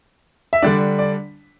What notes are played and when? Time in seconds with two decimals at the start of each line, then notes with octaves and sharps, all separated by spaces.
0.53 E5
0.62 D3 G3 D4 D5
0.99 D5